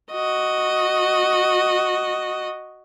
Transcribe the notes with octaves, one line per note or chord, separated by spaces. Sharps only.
F#4 D#5